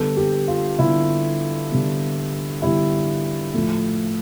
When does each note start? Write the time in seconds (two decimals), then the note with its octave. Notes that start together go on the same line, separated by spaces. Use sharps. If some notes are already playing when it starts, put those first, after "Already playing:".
Already playing: D3 G3 B3 A4
0.17 G4
0.48 F4
0.79 D3 G3 B3 E4
1.70 D3 G3 B3
2.62 D3 G3 B3 E4
3.54 A2 F3 A3